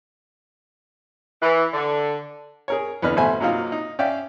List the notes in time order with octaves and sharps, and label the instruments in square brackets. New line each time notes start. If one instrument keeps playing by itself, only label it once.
[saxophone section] E3
D3
[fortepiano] G#4 A#4 C#5
E2 D3 B4 D#5 B5 F6
A1 B2 A3 C5 E5 G#5
C3 F#3 A#3 D#4 F4
D#4
C#4 D5 E5 F5 G5